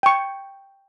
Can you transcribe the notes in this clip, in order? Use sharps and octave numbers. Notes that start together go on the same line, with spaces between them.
G5 C#6